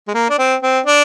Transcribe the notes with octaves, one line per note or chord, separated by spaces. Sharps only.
G#3
A#3
D4
C4
C4
D4